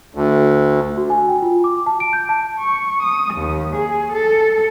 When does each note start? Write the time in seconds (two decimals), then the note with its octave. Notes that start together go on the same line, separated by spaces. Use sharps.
0.15 D2
0.98 F#4
1.10 G#5
1.28 G5
1.42 F4
1.64 D6
1.86 A5
2.00 D7
2.13 G6
2.29 A5
2.59 C#6
3.04 D#6
3.35 D#2
3.76 G#4
4.14 A4